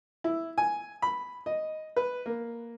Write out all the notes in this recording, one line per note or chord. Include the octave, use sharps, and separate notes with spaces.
E4
G#5
B5
D#5
B4
A#3